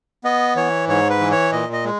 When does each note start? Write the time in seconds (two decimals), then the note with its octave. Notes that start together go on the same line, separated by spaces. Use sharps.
0.24 B3 D#5
0.56 E3 C#5
0.88 G#2 C#5
1.10 B4
1.20 E3
1.32 C#5
1.52 A#2 D#5
1.73 D#5
1.84 G#3